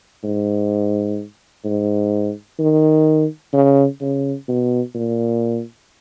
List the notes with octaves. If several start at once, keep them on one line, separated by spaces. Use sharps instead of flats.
G#2
G#2
D#3
C#3
C#3
B2
A#2